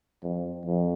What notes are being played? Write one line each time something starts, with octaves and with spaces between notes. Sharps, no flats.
F2
F2